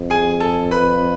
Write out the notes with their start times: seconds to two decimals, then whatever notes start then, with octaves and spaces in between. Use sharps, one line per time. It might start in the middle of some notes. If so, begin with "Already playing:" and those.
Already playing: F2
0.10 G#4 G#5
0.40 A4 A5
0.71 B4 B5